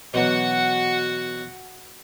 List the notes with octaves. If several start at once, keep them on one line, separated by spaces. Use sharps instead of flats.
B2 E3 F#3 F#4 F#5